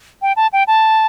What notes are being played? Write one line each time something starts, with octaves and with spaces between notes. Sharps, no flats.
G5
A5
G5
A5